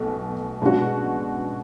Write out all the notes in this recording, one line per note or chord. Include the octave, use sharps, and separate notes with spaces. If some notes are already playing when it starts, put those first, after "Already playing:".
Already playing: B1 B2 A3
B2 G#3 D4 F#4